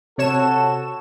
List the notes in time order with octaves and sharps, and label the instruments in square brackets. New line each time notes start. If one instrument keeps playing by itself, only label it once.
[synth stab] C3 C#5 E7 [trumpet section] F#4 A4